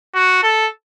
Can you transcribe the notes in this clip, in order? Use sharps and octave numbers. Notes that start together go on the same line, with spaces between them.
F#4
A4